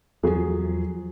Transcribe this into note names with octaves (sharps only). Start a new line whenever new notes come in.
E2 F3 F#3 G#4